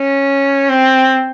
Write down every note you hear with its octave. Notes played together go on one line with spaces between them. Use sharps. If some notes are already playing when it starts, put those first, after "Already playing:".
Already playing: C#4
C4